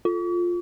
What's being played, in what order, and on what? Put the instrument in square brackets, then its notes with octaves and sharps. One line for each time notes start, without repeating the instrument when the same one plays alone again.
[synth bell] F4